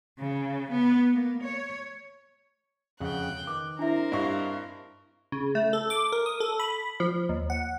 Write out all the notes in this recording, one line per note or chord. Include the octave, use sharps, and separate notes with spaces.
C#3
B3
A#3
C#5
F2 C#3 F#5 G5 F#6
D#3 B4 D6
C4 D4 E4 A#4 E5
G2 E4 D5 D#5 F5 C#6
C#3
A3
A4
D6
A#4
D#6
A4
B5
F3
D#2
F#5